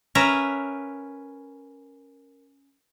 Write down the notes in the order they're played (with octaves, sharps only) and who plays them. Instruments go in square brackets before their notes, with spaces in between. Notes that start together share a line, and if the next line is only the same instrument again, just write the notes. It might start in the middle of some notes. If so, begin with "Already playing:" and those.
[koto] C#4 A#4 B4 E5